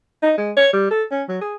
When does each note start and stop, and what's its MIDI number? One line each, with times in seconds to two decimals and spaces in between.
0.22 0.33 63
0.38 0.52 56
0.57 0.72 73
0.73 0.90 55
0.91 1.03 69
1.11 1.23 61
1.29 1.40 54
1.41 1.56 68